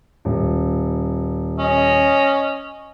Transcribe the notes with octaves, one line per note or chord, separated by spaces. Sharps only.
D#1
C#4 D#5